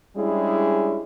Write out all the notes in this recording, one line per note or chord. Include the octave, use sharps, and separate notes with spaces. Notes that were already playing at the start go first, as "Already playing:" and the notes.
G3 G#3 C#4 D4 E4 G#4